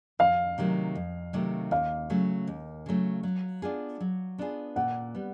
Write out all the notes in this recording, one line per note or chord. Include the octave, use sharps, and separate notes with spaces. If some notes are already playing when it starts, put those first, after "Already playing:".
F2 F5
C3 D#3 F#3 A3
F2
C3 D#3 F#3 A3
D#2 F5
C#3 F#3 A3
D#2
C#3 F#3 A3
F#3
B3 D4 F4 G#4
F#3
B3 D4 F4 G#4
A#2 F#5
G3 B3